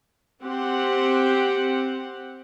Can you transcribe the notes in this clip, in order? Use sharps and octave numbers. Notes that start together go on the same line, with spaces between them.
C4 G4 F#5